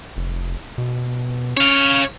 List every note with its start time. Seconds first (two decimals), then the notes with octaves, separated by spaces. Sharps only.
0.17 F1
0.78 B2
1.57 C#4 C#5 F5